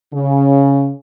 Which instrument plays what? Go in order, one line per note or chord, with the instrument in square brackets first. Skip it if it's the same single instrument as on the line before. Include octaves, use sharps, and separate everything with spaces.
[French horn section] C#3